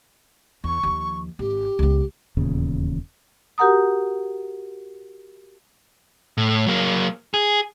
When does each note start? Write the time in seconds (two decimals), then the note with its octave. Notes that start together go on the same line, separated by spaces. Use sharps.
0.64 E2 C#6
0.83 D#2 F3
1.39 G#1 G4
1.79 C#2 B3
2.37 D#1 E2 A#2 C#3
3.58 F#4 G4 A#4 F#5 A#5 D#6
6.38 A2
6.67 F#3 A#3
7.34 G#4